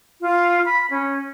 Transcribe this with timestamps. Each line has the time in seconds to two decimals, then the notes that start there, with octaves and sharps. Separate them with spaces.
0.21 F4
0.65 B5
0.90 C#4